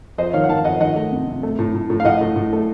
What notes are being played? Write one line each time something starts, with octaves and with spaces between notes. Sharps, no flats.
F2 C5 D#5
D#3 C#5 F5
F#5
D#3 F5 A5
F2 D#5 F#5
D#3 D#5 F#5
A3
C3
C3
A3
A2
A2
A2
F5
A2 D#5 F#5
A2
A2
A3